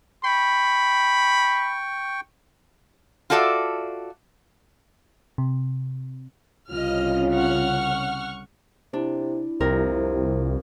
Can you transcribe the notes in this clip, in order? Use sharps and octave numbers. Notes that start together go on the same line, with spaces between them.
G5 B5 C#6
F4 F#4 A4 D5 E5 F5
C3
C2 C#3 F4 D#5 F6
F#5 C#6 F6
C3 D4 E4
C2 F2 C3 A#4